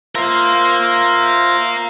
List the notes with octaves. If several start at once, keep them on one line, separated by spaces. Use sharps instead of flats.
F4 A#4 C5 E5 F5